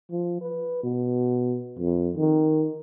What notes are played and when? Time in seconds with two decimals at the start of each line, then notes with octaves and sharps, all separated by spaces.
0.11 F3
0.41 B4
0.83 B2
1.79 F2
2.17 D#3